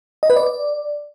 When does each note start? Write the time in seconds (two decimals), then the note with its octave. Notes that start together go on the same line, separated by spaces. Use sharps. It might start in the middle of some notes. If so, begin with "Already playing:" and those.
0.23 D#5
0.30 B4
0.36 D5